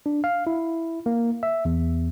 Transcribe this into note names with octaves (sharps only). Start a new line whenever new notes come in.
D4
F5
E4
A#3
E5
E2